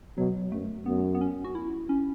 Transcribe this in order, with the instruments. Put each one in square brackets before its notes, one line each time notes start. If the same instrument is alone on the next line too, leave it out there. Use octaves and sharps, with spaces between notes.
[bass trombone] B2 [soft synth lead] F#3
[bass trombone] F#2 [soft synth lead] A3
[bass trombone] F#2 [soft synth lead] B3
[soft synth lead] B3
C#4
F#4
E4
C#4